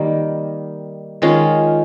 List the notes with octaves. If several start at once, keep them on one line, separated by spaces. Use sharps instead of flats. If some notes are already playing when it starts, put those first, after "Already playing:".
Already playing: D#3 G3 A#3
D#3 G#3 C#4 F4